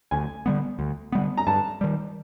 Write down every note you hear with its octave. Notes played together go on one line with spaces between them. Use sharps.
D2 G#5
D3 G3 B3
D2
D3 G3 B3
A#5
G2 A5
D#3 G3